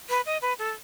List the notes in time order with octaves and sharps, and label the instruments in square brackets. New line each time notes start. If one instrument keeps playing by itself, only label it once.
[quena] B4
D#5
B4
A4